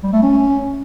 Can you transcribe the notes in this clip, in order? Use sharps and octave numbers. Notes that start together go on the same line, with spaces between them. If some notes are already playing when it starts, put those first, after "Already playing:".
G3
A3
C#4